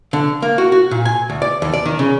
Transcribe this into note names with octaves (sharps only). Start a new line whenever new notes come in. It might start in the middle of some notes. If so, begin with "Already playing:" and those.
D3
A#3
F#4
F#4
A#2
G#5
D2
D5
D#2
D5
D#3
C#3